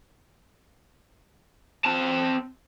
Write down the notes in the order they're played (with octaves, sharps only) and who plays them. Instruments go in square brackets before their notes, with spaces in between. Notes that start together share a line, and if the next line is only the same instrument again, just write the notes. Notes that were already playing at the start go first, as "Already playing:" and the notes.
[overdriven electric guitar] C4 A5